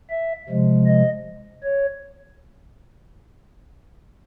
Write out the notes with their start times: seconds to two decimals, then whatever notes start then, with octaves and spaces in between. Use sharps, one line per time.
0.10 E5
0.49 C3 F3 G#3
0.87 D#5
1.63 C#5